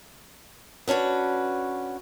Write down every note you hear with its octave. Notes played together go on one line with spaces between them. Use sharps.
B3 C#4 D4 F#4 B4